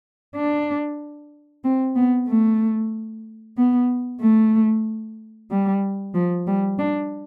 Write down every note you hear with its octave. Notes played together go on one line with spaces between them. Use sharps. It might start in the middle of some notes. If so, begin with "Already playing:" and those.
D4
C4
B3
A3
B3
A3
G3
F3
G3
D4